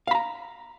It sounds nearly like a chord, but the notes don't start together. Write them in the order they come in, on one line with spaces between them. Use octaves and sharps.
F5 B5 A#5